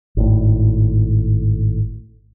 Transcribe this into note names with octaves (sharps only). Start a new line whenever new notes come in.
G#1 A2